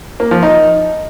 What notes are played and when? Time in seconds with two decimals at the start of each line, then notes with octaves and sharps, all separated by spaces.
0.20 A#3
0.31 F3
0.43 D#4